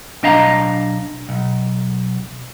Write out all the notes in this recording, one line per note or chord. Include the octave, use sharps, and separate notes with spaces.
B1 D4 D#5 F5 A#5
B1